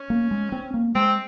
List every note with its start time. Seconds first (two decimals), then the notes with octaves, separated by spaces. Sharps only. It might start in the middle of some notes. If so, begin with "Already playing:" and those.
Already playing: C#4
0.10 A#3
0.31 G#3
0.52 C4
0.74 A#3
0.95 G#3 C4